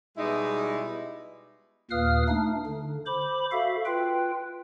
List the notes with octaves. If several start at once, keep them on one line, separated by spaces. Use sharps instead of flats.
B2 G3 G#3 D#4 E4
D#2 A#2 B4 F5 D#6 F6
A3 D4 D#4
D3
C5 B5 D6
F#4 A4 E5 F5
F4 B4 G5